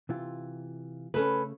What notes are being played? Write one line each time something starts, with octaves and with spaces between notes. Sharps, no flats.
C3 E3 F4
C#3 A3 C#4 A4 B4